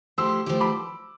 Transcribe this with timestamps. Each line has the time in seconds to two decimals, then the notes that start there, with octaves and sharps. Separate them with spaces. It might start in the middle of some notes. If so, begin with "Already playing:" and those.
0.18 F3 A3 E4 G4 C6 E6
0.46 F3 A3 E4 G4
0.60 B5 D6